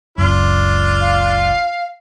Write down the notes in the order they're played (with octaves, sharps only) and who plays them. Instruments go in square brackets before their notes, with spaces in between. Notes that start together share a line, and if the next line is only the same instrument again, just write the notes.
[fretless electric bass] F#1 C#2 F#2 [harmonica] D4 F4
[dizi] F5